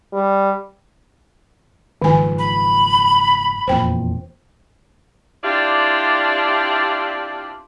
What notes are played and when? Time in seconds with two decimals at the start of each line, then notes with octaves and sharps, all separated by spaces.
0.13 G3
2.02 F#1 G#2 D#3 F3 G#5
2.39 B5
3.68 E1 F2 A#2 C5 G5
5.43 C4 D4 E4 F4 G4 D5